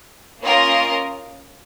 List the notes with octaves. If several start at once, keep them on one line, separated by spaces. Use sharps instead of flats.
A#3 C#4 F4 A#4 D#5